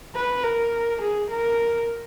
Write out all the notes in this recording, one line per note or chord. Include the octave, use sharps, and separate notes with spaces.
B4
A#4
G#4
A#4